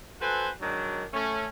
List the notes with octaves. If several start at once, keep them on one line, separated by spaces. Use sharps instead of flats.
F#4 A4 B4 C5 G#5
D#3 F#3 G#3 D4
A3 C#4